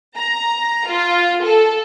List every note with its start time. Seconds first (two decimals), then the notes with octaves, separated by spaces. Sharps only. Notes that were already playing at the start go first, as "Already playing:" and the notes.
0.17 A#5
0.89 F4
1.45 A4